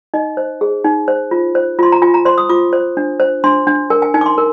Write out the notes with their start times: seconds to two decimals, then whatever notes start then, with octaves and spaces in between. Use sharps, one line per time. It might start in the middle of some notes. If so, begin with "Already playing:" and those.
0.14 D#4 D#5
0.37 C5
0.61 G#4
0.84 D#4
1.08 C5
1.31 F4
1.55 C5
1.79 F4 C6
1.92 A#5
2.02 F4 G#5
2.14 A#5
2.25 C5 C6
2.38 D#6
2.49 F4 D6
2.73 C5
2.97 D4
3.20 C5
3.44 D4 C6
3.67 D4
3.90 A#4 G#5
4.02 G#5
4.14 D#4 G#5
4.21 D6
4.26 C6
4.38 A#4